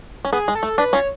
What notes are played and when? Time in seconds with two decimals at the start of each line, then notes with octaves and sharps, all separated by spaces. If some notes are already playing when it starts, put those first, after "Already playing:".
0.25 C#4
0.33 B3 G#4
0.48 G#3
0.55 A4
0.63 A3
0.78 D4 B4
0.93 C#4 F4 C#5